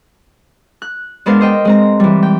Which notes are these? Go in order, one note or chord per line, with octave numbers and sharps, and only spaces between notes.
F#6
G#3 B3 D4 A#4 C5 F5
C5 D#5 G5
G#3 C4 A#5
E3 G3
G5